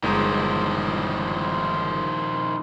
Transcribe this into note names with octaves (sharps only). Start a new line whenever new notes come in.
G1 D#3 F3 G#3 A#5